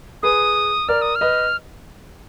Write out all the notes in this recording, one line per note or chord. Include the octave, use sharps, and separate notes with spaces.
G#4 B4 D#6
A#4 D5 F6
D#6
F6
B4 D#5